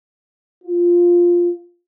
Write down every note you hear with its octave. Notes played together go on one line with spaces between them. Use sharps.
F4